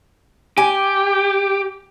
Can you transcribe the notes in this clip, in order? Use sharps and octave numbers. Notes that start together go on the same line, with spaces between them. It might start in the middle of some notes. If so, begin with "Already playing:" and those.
G4 G#5